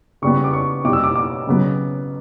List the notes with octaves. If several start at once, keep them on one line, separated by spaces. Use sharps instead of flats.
C#3 G3 B3 C#6
D6
C#6
B2 G3 B3 D6
E6
D6
D6
C#3 F#3 B3